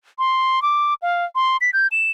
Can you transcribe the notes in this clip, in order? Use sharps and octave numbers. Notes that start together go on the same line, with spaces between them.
C6
D6
F5
C6
B6
G6
E7